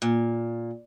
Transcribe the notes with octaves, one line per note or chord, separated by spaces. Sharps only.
A#2